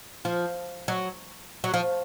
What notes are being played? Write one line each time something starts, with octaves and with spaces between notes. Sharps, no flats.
F3
F#3
F#3
F3